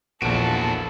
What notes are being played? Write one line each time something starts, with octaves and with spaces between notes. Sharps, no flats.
A#1 E2 A#2 E4 F#4 A4 D7